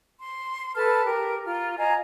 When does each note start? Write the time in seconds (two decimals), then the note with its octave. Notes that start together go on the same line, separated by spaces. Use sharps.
0.19 C6
0.76 A4 B4 A5 F6
1.03 G4 A#4
1.44 F4 A#5 F6
1.78 D#5 F5 G#5 A#5